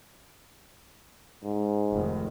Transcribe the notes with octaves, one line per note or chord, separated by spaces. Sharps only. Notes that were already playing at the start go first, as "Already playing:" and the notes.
G#2
F1 D#3